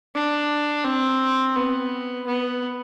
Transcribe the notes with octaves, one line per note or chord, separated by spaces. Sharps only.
D4
C4
B3
B3